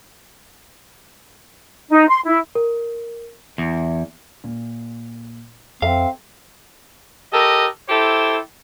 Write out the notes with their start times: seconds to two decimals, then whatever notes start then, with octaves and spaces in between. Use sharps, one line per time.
1.89 D#4
2.08 C6
2.26 E4
2.55 A#4
3.58 E2
4.44 A#2
5.82 F2 C4 A4 E5 F5
7.32 G4 A4 A#4 D#5
7.88 E4 G4 A4 C5